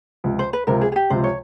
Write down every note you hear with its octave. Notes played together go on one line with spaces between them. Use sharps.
C#2 C3 F3
C5
B4
C#2 C3 F3 A#4
G#4
G#4
G4
C#2 C3 F3 C5
C#5